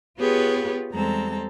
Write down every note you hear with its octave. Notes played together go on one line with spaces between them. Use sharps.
B3 F4 G4 G#4 B4 C#5
E2 G3 G#3 C4 A4 A#5